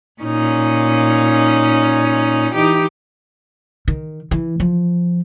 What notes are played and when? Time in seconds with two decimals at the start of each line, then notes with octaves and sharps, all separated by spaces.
0.22 A#2 C#4 D#4
2.55 E3 D#4 G4
3.88 D#3
4.31 E3
4.60 F3